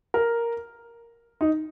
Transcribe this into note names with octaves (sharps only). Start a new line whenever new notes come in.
A#4
D#4